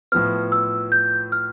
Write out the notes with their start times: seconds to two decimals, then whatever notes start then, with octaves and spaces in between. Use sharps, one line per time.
0.12 A2 F3 B3 F6
0.52 E6
0.92 G6
1.32 F6